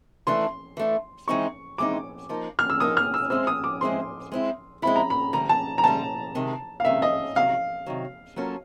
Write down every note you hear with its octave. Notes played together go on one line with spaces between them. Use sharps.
E3 A3 D4 C6
E3 A3 D4
E3 G#3 C4 D#4 C#6
E3 G#3 C4 D#4 D6
F3 A#3 D#4
F6
E6
F3 A#3 D#4 D#6
F6
E6
G#3 C4 E4 G#4 C5 E6
D#6
D6
G#3 C4 E4 G#4 C5 C6
G#3 C4 E4
G#3 C4 E4 B5
A#5
B5
D2 D3 G3 A#5
A5
A#5
D2 D3 G3 A5
C3 D#3 G#3
F5
C3 D#3 G#3 E5
D#5
C3 D#3 F#3 F5
C3 D#3 F#3
F#3 A#3 C#4 F4 A4